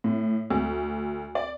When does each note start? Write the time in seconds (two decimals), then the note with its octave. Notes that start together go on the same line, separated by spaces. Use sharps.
0.04 A2
0.50 D2
1.35 D5